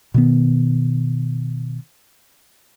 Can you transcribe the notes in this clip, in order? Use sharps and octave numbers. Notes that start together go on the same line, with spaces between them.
B2 D#3 B3